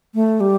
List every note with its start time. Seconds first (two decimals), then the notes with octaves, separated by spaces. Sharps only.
0.15 A3
0.40 G3